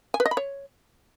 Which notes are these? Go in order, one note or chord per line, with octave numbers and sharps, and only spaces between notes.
G#5
B4
D#5
B5
C#5